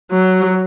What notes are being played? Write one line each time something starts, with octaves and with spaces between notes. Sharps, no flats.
F#3